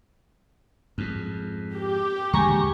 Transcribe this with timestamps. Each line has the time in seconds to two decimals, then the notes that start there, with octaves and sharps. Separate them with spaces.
0.98 F2 G#2
1.76 G4
2.33 D#2 D3 G#3 G#5 A#5 C#6